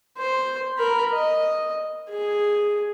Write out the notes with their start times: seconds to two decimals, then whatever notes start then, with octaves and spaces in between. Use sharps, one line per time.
0.18 C5
0.78 A#4 B5
1.13 D#5
2.10 G#4